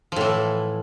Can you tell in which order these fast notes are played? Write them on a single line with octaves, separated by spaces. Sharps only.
F3 A2 E3